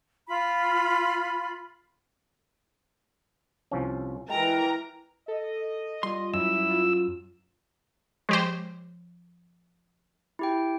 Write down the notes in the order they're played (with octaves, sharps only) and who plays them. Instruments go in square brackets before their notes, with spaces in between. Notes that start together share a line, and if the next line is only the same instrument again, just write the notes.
[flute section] F4 B5
[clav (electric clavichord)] C2 F3 C#4
[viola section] E3 A#4 A#5 [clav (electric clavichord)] G#3 [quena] G5
[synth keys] A4 [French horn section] D#5
[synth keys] G3 F4 [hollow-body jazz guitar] C6
[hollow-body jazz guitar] F#2 [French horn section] E4 [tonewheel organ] E6
[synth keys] F4
[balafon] F3 [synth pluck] G#3 G4 C5
[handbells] E4 G4 G5